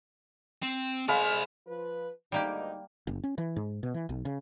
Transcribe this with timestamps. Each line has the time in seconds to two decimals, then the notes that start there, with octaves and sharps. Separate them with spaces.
0.63 C4
1.08 G#3 C5 D5 F5 B5
1.66 F3 B4
2.32 D2 G#2 G3 A#3 D#4 G4
3.07 F#1
3.24 C#4
3.38 E3
3.56 G#2
3.83 B2
3.94 E3
4.09 B1
4.25 C#3